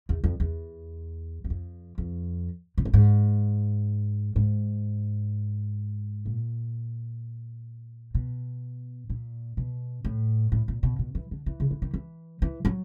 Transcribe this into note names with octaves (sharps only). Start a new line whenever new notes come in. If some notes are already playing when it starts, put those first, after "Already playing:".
E2
F2
E2
F#2
F2
F2
A#2
A2
G#2
G#2
A#2
B2
A#2
B2
A2
A2
A#2
B2
B2
E3
D3
E3
C#3
D3
D#3
E3
E3
F#3